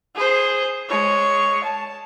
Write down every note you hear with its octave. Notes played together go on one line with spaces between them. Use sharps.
G#4 C5
G#3 C#5
A5